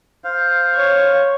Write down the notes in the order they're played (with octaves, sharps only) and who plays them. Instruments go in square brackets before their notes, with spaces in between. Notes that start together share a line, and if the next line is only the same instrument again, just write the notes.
[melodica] C5 F5
[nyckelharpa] C#5